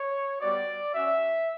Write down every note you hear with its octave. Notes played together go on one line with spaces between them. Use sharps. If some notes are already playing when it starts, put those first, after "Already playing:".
Already playing: C#5
G3 B3 F#4 D5
C#4 F#4 E5